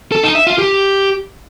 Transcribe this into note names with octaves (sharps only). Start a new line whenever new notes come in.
A4
D#4
E5
F4
G4